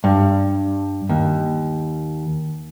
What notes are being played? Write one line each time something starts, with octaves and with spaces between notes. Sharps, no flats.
G2
D#2